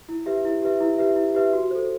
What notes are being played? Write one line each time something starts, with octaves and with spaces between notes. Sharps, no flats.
E4
G4 B4 E5
E4
G4 B4 E5
E4
G4 B4 E5
E4
G4 B4 E5
F#4
A4 C5